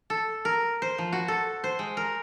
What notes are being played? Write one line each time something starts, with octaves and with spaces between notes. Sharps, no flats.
A4
A#4
C5
F3
F#4
A4
C5
G#3
A#4